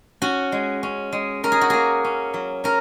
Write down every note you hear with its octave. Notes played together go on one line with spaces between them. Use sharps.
C#4 F#4
G#3
C#4
G#3
C#4 A#4
G#4
F#4
A#3 G#4
C#4
F#3
C#4 A#4